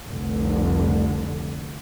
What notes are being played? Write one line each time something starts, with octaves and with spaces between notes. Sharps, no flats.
F1 C2 D3